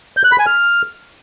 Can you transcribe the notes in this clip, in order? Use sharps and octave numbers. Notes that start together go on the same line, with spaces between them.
G6
F#6
B5
G#5
F6